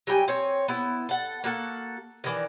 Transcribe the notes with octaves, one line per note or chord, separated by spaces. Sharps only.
F#3 G3 G5 G#5
C4 C#5
B3 E4
A4 F#5
A#3 F#4 A4
D#3 E3 D4